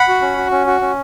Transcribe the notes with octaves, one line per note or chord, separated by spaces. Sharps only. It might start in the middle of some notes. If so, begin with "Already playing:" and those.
Already playing: F#5 B5
F#4
C#4
F#4
C#4
F#4
C#4